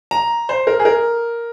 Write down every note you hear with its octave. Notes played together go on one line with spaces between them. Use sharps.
A#5
C5
A#4
G#4
A#4